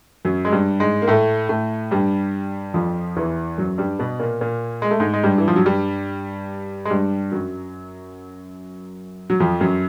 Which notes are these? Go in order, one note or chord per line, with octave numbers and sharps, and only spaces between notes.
F#2 F#3
G#3
G2 G3
G#2 G#3
A#3
A2 A3
A2 A3
G2 G3
F2 F3
E2 E3
F#2 F#3
G2 G3
B2 B3
A#2 A#3
A#2 A#3
G#3
A3
G#2 G#3
G#3
G2 G3
E3
F3
F#3
G2 G3
G#3
G2 G3
F#2 F#3
F#3
F2 F3
F#2 F#3